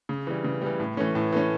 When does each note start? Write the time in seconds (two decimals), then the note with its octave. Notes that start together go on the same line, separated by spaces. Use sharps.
0.09 C#3
0.27 E3 G3
0.44 C#3
0.62 E3 G3
0.80 A2
0.97 E3 A3 C#4
1.15 A2
1.32 E3 A3 C#4